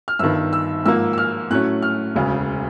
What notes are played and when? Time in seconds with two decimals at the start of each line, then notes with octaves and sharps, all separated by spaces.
0.08 F6
0.19 G1 G2 D#3 E6
0.53 E6
0.86 G#2 F3 A#3 E6
1.13 E6
1.18 F6
1.50 A2 F#3 A3 C#4 F#6
1.82 F6
2.15 E1 D2 C#3